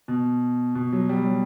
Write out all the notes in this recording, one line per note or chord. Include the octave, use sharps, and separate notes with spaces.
B2
B2
F#3
G3
F#3